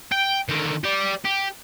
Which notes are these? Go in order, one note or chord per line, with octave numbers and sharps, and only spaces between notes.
G5
D3 D#3
G4 D5
G4